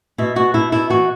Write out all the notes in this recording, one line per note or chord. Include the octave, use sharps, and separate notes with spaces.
B2 E4
B2 F#4
B2 E4
B2 E4
E3 F#4